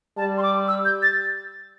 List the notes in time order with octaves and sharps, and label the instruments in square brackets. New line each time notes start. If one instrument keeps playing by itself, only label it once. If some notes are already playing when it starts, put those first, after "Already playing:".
[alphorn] G3 [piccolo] A5
[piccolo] C6
D6
E6
G6
A6